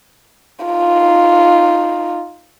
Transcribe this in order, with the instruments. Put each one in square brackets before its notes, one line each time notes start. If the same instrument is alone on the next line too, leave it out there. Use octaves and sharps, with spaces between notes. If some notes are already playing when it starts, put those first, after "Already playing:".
[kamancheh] D#4 F4